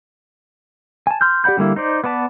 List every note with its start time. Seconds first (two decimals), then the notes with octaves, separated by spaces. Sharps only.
1.07 G#5 A5
1.21 C6 F6 G6
1.44 G4 D5 F#5 B5 G6
1.57 D3 G3 A#3 E4
1.76 D#4 C5 D5
2.04 B3 B4 D5 A5